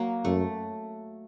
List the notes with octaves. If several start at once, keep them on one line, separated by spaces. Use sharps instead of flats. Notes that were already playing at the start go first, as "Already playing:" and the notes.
Already playing: F#3 A#3
F#2 A3